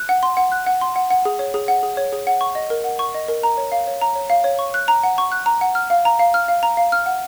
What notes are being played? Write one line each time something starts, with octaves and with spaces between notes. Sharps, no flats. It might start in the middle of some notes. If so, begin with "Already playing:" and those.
Already playing: F#6
F#5
C6
F#5
F#6
F#5
C6
F#5
F#5
G#4
C#5
G#4
F#5
G#4
C#5
G#4
F#5
C#6
D#5
A#4
F#5
C#6
D#5
A#4
A#5
C#5
F5
C#5
A#5
C#5
F5
C#5
C#6
F#6
A#5
F#5
C#6
F#6
A#5
F#5
F6
F5
A#5
F5
F6
F5
A#5
F5
F6
F#5